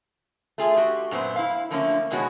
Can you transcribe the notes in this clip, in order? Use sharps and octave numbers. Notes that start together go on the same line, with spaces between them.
A3 F4 G#4 G#5
F#4 G4
F#2 A#2 B3 C5
E4 F5
D3 F3 A3 A#3 C#4
G#2 B2 G#3 B3 F#4 C#5